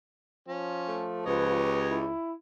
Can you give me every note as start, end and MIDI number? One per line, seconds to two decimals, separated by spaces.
0.48 1.64 53
0.48 1.05 61
0.88 1.23 57
1.26 2.12 37
1.26 2.01 67
1.26 1.95 71
1.26 2.01 73
1.26 2.01 75
1.91 2.33 64